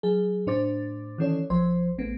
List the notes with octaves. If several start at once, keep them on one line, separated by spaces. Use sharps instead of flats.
F#3 G#4
A2 D4 C5 D6 A6
D#3 E3 C#4 A4 C#5 D5
A#1 F3 C5 C6
A1 A3 B3